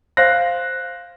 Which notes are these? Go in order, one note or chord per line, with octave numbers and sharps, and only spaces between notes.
C5 F5 F#6 A#6